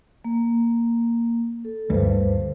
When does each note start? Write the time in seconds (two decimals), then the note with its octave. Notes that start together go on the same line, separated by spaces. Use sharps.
0.25 A#3
1.65 A4
1.90 D2 G2 B4 C5